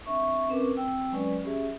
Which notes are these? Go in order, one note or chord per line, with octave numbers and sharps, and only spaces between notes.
C4 D4 E5 C#6
C4 C#4 A#4 B4 D6
C4 G5 E6
F#3 G#3 C#4 B4 D5
C#4 G4 G#4 E5